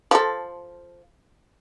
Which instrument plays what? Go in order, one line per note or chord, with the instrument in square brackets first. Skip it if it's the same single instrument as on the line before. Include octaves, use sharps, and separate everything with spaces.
[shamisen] F3 A4